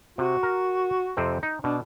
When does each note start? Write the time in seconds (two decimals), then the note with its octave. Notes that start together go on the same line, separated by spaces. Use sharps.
0.18 C3 F#4
0.43 A#4
1.17 F2 C3 C4
1.43 D#4
1.64 B2 D4